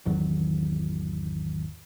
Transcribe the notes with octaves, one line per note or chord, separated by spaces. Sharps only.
G#1 E2 D#3 F#3